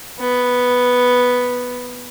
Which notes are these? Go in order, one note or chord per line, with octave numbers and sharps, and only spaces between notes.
B3